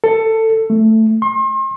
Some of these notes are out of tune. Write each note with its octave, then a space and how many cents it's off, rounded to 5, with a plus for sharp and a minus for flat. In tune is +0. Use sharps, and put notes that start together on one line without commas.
A4 +15
A3 +5
C6 +40